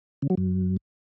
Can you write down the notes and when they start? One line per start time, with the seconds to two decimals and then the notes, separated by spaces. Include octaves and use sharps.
0.22 C#3
0.30 F#3
0.37 F#2